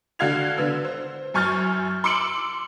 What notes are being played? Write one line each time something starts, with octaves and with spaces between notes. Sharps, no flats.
D3 F#4 F5 G#6 F7
D3 B3 E6
C5
F#2 G#5 C#6 F6 G6 A6
C6 D6 E6 C#7 D7 F#7